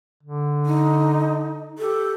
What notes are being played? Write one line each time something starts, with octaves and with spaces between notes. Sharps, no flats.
D3
D#4
G4 A4